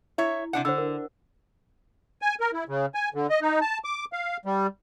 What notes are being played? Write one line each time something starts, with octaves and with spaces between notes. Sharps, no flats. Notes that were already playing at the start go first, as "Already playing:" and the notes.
E4 C#5 E5
C3 D4 F#5
D3 C5 F#5 E6
A#4
G#5
A#4
E4
C#3
G#5
D3
D#5
D#4
A5
D6
F5
G3